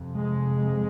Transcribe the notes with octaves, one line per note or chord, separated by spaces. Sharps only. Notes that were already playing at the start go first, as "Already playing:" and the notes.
Already playing: F2 C3
G#3